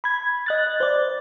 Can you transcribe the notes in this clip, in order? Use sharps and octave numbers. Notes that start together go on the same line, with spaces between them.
B5 G#6
D#5 F#6 A6
C5 D5